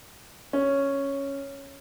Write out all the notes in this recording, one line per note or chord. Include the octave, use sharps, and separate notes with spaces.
C#4